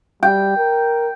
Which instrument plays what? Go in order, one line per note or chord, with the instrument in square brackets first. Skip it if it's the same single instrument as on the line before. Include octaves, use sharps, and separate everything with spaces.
[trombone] G3 [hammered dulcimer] G5
[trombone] A#4